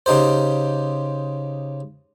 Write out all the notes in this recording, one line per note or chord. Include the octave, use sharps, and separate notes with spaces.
C#3 D#4 G4 C5